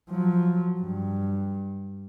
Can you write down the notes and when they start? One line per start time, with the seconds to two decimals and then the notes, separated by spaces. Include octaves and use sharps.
0.10 F3 F#3
0.80 G2